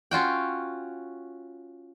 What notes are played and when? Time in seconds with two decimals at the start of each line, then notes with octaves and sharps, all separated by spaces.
0.11 C#4 F4 F#4 G5